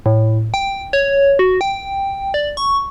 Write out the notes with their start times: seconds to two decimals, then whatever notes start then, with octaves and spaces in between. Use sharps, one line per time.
0.06 A2
0.54 G5
0.93 C#5
1.39 F#4
1.61 G5
2.34 D5
2.57 C#6